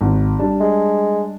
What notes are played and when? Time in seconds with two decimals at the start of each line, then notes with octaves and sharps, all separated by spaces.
0.01 G#1
0.39 G3 D4 A5
0.60 G#3